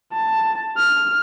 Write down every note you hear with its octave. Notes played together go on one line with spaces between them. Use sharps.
A5
F6